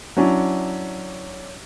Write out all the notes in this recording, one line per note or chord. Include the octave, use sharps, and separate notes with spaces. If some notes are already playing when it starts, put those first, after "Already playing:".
F#3 C#4 D4 E4